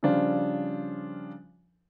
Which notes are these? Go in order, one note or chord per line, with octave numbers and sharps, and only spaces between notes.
C#3 F3 G3 D4 F4 C5